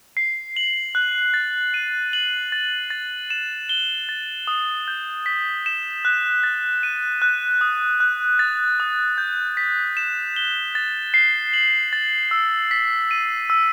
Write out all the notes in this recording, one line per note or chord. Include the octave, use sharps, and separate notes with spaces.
C7
F#7
F#6
A6
D#7
F#7
A6
A6
E7
G7
A6
D#6
G6
B6
E7
F#6
A6
D#7
F#6
D#6
F#6
A6
D#6
G6
B6
E7
G7
A6
C7
F#7
A6
E6
B6
D#7
E6